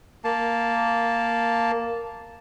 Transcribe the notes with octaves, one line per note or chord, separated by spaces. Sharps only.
A#3 A5